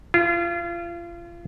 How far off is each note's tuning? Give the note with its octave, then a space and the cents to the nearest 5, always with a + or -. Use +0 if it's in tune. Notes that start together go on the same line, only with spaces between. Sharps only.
F4 -30